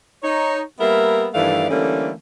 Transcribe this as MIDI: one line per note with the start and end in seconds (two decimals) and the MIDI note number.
0.23 0.61 63
0.23 0.61 73
0.80 1.28 55
0.80 1.28 58
0.80 1.28 59
0.80 1.28 70
0.80 1.28 76
1.34 1.70 43
1.34 1.70 51
1.34 1.70 52
1.34 1.70 57
1.34 1.70 74
1.34 1.70 77
1.70 2.12 50
1.70 2.12 52
1.70 2.12 55
1.70 2.12 57
1.70 2.12 58
1.70 2.12 61